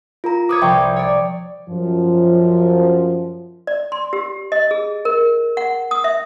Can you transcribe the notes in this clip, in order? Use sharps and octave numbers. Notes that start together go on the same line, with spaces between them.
F4 A#4 A#5
B4 C#5 D6 D#6 G#6
C2 F3 G4 E5 G5 C#6
C#5 D5
F#2 F3
D5
C6
G4
D#5
G#4
A#4
F#5
D#6
E5